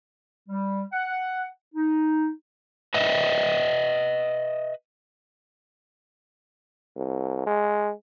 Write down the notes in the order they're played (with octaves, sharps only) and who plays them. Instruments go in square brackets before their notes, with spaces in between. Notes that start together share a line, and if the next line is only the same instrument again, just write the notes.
[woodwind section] G3
F#5
D#4
[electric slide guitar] B4 D#5 E5
[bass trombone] C2
G#3